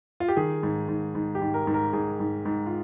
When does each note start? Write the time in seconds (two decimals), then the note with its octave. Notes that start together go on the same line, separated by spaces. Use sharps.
0.20 F4
0.28 G4
0.37 D#3 G#4
0.63 G#2
0.88 G#2
1.15 G#2
1.35 G4
1.42 G#2
1.54 A#4
1.67 G#2
1.74 A#4
1.93 G#2 G#4
2.20 G#2
2.45 G#2
2.66 F4